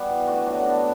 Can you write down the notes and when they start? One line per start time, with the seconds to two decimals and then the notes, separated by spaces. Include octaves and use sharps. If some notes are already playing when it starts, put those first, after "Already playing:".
Already playing: G3 B3 F#4
0.09 E3
0.27 A3 D4 F#4
0.46 F#3
0.66 B3 D4